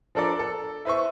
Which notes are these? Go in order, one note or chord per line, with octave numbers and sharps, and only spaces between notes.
F3 D4 A4 A#4 D5
A4
E4 B4 C5 E5 C#6